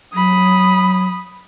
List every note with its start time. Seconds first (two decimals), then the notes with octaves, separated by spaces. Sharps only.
0.14 F#3 B5 D#6